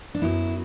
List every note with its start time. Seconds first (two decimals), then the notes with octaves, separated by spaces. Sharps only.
0.14 D4
0.22 F#2 F#3 B3 E4